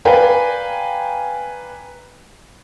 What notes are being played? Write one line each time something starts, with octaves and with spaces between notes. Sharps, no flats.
B4 D5 F5 G5 G#5 A#5